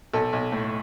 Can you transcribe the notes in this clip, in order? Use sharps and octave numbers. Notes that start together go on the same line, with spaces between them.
B1 A4
B1
A2